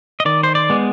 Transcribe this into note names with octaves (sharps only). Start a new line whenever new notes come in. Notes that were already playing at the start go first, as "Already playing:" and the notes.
D#5
D#3 D5
C5
D5
G#3 B3